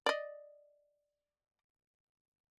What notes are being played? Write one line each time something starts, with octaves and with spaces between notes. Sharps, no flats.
D5 D#5